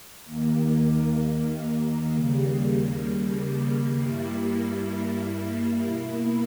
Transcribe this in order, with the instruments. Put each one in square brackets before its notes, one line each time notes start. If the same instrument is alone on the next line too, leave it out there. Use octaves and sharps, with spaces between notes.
[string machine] D#2 D#3 A#3
D#2 C#3 G3 A#3
G2 G3 A#3 E4
B2 A#3 E4